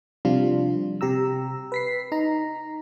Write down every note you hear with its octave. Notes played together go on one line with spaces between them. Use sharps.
C3 F3 G3 D4 F4
C3 G4 A#5 E6
B4 B6 C7
D#4 A#5